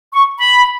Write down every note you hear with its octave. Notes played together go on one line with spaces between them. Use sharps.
C#6
B5